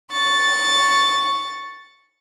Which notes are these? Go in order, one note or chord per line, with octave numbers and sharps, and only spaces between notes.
C#6 A6